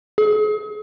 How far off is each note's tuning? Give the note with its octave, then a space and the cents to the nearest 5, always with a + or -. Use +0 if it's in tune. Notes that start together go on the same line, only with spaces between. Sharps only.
G#4 +40